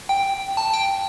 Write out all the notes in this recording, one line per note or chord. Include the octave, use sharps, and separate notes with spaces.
G5
A5
G5